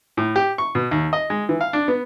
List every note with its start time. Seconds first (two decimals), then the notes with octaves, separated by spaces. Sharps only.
0.17 A2
0.36 G4
0.58 C#6
0.75 B2
0.91 D#2
1.13 D#5
1.30 G#3
1.49 E3
1.61 F5
1.73 D4
1.88 B3